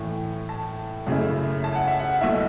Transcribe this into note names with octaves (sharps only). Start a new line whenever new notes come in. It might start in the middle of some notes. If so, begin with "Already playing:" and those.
Already playing: A2 E3 A3
A5
F#2 C#3 A3 E4
A5
F#5
E5
F#5
B1 B2 A3 E4 E5